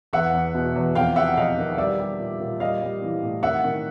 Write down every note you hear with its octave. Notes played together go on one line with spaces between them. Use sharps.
E2 E5 F#5
E2
B2
E2
F2 F5 G5
C3 E5 F#5
F2 D#5 F5
D#3
G3 D5 E5
G3
A#2
A#2
G3 D#5 F5
G3
E3
A2
D#3 E5 F#5
D#3